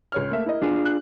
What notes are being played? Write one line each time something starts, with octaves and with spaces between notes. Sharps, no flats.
C#2 C#5 F6
A3 A#3 E5
E4 A#4 D#5
E2 D4 F4 G#4
F#6